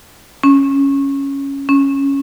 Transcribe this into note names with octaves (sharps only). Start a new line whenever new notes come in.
C#4
C#4